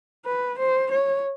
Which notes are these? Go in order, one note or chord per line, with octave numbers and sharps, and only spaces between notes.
B4
C5
C#5